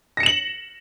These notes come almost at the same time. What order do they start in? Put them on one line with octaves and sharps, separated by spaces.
A#6 C#7 E7 F#7